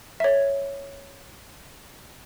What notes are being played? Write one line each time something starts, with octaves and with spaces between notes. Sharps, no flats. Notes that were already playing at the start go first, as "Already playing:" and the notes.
C#5 E5